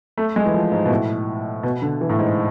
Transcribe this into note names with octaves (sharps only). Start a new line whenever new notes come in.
A3
G#3
E3
F3
G#2
B2
A2
B2
D3
E3
A2
G#2